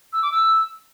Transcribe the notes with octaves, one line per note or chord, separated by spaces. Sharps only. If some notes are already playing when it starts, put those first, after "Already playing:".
E6
D6
E6